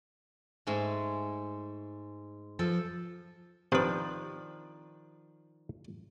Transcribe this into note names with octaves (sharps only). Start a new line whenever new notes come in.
G#2 G#3 A3
F3 A4
C3 D#3 F3 D4 B4